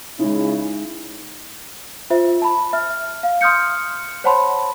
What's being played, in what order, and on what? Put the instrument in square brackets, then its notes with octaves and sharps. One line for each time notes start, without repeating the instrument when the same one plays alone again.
[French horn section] C#3 E4 [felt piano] G#3 D#4
[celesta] F4 C5 E5
A5 B5
E5 F6
F5
C6 D#6 F6 G6 C#7
C5 C#5 F#5 A5 B5 C6